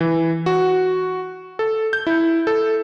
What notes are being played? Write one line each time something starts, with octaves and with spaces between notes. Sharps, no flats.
E3
F#4
A4
G6
E4
A4